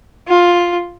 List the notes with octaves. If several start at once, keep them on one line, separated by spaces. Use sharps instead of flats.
F4